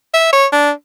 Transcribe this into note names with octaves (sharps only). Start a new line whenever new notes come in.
E5
C#5
D4